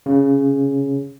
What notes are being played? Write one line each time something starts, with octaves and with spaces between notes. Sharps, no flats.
C#3